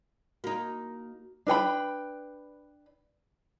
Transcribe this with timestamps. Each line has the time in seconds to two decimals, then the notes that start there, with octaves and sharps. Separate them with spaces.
0.44 A#3 D#4 F#4
1.47 D4 B4 G5 B5